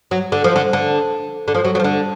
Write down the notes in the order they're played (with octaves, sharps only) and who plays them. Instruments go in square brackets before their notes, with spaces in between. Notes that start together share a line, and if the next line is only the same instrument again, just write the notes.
[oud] F#3
D3
F3
D3
D3
D3
F3
F#3
F#3
F3
D3